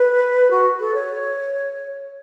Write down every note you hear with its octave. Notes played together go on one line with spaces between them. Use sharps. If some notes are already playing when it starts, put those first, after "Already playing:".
Already playing: B4
F#4
A4
C#5